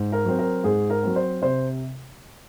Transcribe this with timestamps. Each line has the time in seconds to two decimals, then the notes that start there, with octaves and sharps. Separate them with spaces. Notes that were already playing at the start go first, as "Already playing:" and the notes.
Already playing: G#2
0.12 A#4
0.25 F#3 C4
0.39 A#4
0.64 G#2 G#4
0.90 A#4
1.03 F#3 C4
1.16 C5
1.42 C3 C5